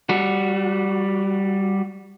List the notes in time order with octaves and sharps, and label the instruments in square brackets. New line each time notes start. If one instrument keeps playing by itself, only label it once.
[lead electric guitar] G3 F#4